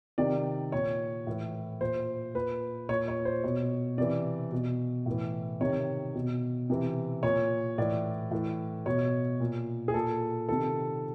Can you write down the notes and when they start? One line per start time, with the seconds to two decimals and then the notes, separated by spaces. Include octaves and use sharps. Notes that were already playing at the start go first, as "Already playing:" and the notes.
0.18 C3 D#3 D5
0.72 A#2 C#5
1.27 A2 E3
1.81 A#2 C5
2.35 A#2 B4
2.89 A#2 C#5
3.08 C#5
3.25 C5
3.44 B2 C#5
3.98 C3 E3 D5
4.52 B2
5.06 A2 E3
5.61 C3 D#3 C#5
6.15 B2
6.70 C3 E3
7.23 A#2 C#5
7.78 A2 E3 D5
8.31 A2 E3
8.86 B2 C#5
9.40 A#2
9.88 G#4
9.94 A#2 A4
10.49 C3 D#3 A4